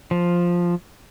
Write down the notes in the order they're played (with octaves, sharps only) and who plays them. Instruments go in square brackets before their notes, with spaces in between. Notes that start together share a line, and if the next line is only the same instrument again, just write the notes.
[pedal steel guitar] F3